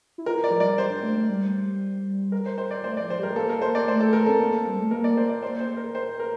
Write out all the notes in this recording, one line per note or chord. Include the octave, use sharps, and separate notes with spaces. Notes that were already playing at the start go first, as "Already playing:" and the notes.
E4
F4 A#4
D5
F3
G3 D5
G3 C5
D4
A3
A3
G3
A#4
C5
C5
D5
A3 C5
F3 D5
C5
G3 A#4
A3
A#3 A4
A#4
A3
A#3 C5
D5
A3 C5
A4
A#4
C4 A4
A#3
G3
A3
A#3 A#4
D5
C5
D5
C5
C5
A#4
C5
A#4